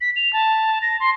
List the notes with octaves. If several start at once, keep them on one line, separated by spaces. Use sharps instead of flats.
B6
F7
A5
A#6
C6